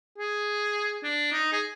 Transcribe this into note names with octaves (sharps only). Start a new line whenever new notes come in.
G#4
D4
D#4
G#4